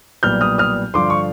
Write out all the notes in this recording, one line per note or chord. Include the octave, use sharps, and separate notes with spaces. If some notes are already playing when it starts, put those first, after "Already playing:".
B1 A#2 G3 B3 F6 G6
D#6 F6
D#6 F6
G2 D3 F3 C6 D6
C#6